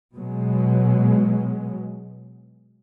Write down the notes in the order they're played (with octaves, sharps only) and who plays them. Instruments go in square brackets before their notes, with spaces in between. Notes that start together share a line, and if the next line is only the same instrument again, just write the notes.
[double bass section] B2 F#3 G#3